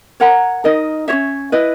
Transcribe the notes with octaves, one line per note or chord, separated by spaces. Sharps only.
A#4 C#5 F#5 A#5
D#4 A#4 D#5
C#4 F#4 C#5 E5
E4 B4 D#5